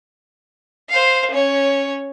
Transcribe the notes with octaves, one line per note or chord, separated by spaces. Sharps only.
C5 F5
C#4 C#5